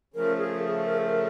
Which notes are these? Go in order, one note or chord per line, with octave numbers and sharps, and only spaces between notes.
C#3 F3 A3 A#4
G#4
A#4
A4
A#4